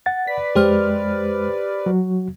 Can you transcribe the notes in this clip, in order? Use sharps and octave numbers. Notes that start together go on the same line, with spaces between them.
F#5 A6
B4 D5 B6
F2 G#3 G4 C5 F6
F#3 F#4